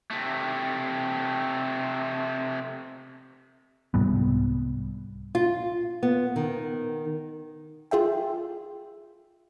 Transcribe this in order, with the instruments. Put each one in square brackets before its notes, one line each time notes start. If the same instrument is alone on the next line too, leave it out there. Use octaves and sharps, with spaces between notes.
[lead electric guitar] C3 A3
[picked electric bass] C2 G#2 G3 B3
[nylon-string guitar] F4
B3
D#3
[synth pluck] F4 G#4 E5 G5